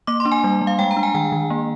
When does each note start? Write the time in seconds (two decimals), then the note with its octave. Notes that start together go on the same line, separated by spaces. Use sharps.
0.07 A#3 D6
0.20 C6
0.25 D4
0.32 G#5
0.44 G3
0.62 G3
0.67 F5
0.79 G#3 G5
0.91 A#5
0.97 D4
1.03 G#5
1.15 D#3 G5
1.32 D#3
1.50 A#3